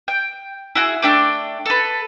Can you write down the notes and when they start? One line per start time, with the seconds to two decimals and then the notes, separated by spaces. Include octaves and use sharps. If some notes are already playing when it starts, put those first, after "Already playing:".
0.08 G5
0.75 E4 F#4 G#4
1.02 A3 D4 G5 D6
1.66 A4 B4